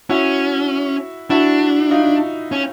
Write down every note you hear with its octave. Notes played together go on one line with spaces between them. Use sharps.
C#4 E4 F#4
D4 E4 F#4
D#4 F4
C#4